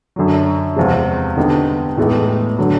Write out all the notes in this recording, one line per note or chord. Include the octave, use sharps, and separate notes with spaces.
F#2 D3 F#3
E2 C3 F3 G#3
D3 G3 B3 D#4 G4
A2 E3 G#3 B3 D#4
D3 F#3